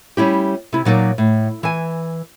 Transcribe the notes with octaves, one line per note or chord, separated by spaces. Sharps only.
G3 C#4 E4 G4
C3 E4
A#2 F#3 D#4 D5
A2
E3 G#5